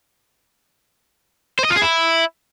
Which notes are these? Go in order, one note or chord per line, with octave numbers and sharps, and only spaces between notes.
C5
D#5
F4
G#4
E4